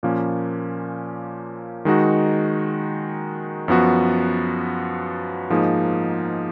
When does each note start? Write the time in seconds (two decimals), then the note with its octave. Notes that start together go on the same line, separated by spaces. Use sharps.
0.03 A#2 F3 A#3 C#4
1.85 D#3 G#3 D#4 F#4
3.68 F#2 F3 B3 F#4
5.50 G#2 F3 A#3 D#4 G#4